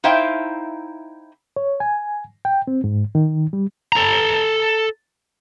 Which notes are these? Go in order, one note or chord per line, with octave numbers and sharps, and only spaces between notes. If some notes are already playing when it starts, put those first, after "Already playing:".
D#4 E4 C5 E5 F5 G5
C#5
G#5
G5
C4
G#2
D#3
G3
A4 A#5